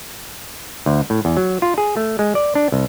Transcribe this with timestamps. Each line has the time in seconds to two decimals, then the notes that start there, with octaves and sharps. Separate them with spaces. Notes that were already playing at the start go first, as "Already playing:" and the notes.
0.86 D2
1.10 A2
1.25 E2
1.37 F#3
1.62 F4
1.78 G#4
1.97 A3
2.19 G#3
2.35 D5
2.55 D4
2.72 C2